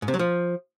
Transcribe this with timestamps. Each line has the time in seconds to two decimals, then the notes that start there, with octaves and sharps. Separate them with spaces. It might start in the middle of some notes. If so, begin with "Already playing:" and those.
0.02 G#2
0.08 C3
0.14 F#3
0.19 F3